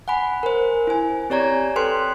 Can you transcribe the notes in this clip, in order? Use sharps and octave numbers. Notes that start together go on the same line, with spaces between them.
F#5 G#5 B5
A#4 C5
E4 G#5
C4 G4 C#5 D5 A#5 G#6
A4 B4 G5 C6 F#6